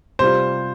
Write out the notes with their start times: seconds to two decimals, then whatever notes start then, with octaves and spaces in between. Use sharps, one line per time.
0.19 C3 G3 F4 C5